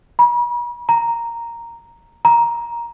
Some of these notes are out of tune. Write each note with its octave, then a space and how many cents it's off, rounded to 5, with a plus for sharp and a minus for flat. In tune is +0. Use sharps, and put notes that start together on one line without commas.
B5 -45
A#5 -5
A#5 +10